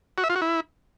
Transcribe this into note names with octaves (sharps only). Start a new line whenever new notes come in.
F#4
E5
F4
F#4
E4